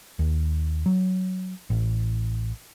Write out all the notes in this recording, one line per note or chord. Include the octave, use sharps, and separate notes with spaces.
D#2
F#3
A1